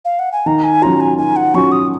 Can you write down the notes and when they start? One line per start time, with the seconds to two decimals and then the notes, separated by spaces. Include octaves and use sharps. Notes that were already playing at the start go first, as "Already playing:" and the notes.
0.05 F5
0.19 F#5
0.32 G#5
0.46 D#3 A#5
0.64 G#5
0.82 F#3 C#4 F4 A#5
1.01 G#5
1.18 D#3 G#5
1.36 F#5
1.54 F#3 C#4 F4 C#6
1.72 D#6